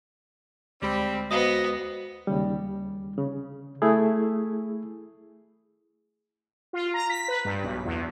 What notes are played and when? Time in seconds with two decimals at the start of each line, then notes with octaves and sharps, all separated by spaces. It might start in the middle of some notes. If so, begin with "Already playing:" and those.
0.82 D2 G3 G#3 C4 B5
1.31 B3 F#4 C5 D#5
2.27 D#2 C#3 G3
3.18 C#3
3.82 A3 E4 G#4
6.73 F4
6.94 A#5
7.10 B6
7.28 B4
7.45 G2
7.63 B1
7.85 E2